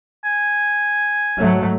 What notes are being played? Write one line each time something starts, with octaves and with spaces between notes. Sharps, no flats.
G#5
G#2 F#3 A3